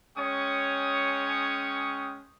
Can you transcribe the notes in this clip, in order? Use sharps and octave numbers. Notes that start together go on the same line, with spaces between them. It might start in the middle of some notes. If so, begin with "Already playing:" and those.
G#3 C#4 C#5 G5 C#6 D#6